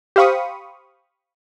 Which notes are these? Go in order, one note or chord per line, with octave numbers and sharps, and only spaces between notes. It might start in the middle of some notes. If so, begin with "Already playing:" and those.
G4 C5 F5 B5 C#6 D#6